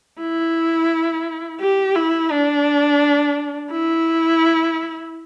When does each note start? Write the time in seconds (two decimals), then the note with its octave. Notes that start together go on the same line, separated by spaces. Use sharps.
0.20 E4
1.60 G4
1.95 E4
2.30 D4
3.71 E4